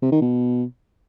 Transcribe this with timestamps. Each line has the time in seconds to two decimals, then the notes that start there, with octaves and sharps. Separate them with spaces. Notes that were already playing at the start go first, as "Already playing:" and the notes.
0.02 C3
0.12 D#3
0.22 B2